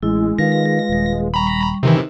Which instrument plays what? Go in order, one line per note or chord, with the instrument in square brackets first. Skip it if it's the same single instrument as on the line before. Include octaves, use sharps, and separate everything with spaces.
[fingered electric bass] A1 [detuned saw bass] G#3 [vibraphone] E4
[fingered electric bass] D#3 [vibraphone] F4 B4 F5 [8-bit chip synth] A#6
[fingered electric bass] D#1
[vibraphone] G3 C#6 [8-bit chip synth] A#5 B5
[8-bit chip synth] C3 D#3 E3 [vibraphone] D#4